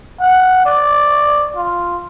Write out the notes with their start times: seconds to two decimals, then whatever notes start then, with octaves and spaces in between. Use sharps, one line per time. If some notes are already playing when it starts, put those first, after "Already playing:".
0.20 F#5
0.66 D5
1.56 F4